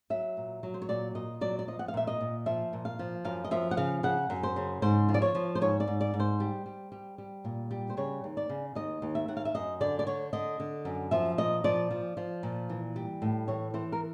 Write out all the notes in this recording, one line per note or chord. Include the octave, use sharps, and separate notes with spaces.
F#3 E5
A#2
F#3
C5
C#5
A#2 D5
A#2 D#5
F#3 D5
D5
F3 D#5
F#5
F5
A#2 E5
D#5
A#2
F3 E5
A#2
F5
F3
F#2 F5
D#5
F3 E5
F#5
C#3 F5
C#3 F#5
F#2
C5
C#3
G#2 C5
F3
D5
C#5
F3
C5
G#2 C#5
D5
G#2
D5
G#2
C5
G3
G3
G3
G3
A#2
G3
C5
C#3 C#5
D#2
D5
C#3
D#2 D#5
D#2
E5
D#2 F#5
F5
E5
F#2 D#5
D3 D5
D5
D3 C#5
D3 D#5
D3
F#2
F3 E5
A#2 D#5
F3 D5
F3
F3
A#2
E3
G3
A2
E3 C#5
E3 C5
A#4